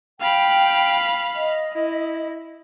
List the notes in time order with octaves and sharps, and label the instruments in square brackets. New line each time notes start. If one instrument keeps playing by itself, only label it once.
[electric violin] F5 B5 [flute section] G5
[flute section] D#5
[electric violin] E4